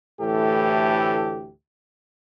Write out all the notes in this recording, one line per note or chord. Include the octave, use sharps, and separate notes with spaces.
D2 A2 E3 A3 G4 A4